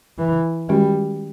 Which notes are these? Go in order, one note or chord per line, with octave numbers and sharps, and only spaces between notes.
E3
D#3 G3 G#3 C#4 F#4